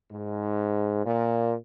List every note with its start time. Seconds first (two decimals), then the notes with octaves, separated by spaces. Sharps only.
0.11 G#2
1.05 A#2